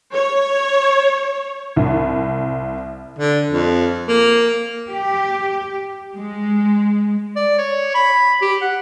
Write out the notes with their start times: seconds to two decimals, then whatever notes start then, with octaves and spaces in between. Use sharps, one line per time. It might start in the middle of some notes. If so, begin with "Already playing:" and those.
0.14 C#5
1.76 C2
3.18 D3
3.51 F2
4.08 A#3
4.90 G4
6.15 G#3
7.36 D5
7.58 C#5
7.95 B5
8.42 G4
8.62 F#5